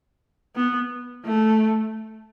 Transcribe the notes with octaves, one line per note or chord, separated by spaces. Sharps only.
B3
A3